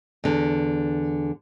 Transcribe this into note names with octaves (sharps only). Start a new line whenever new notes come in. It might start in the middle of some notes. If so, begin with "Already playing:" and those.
E2 D3